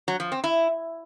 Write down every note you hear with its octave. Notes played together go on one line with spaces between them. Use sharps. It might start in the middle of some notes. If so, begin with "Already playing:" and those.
F#3
F3
C4
E4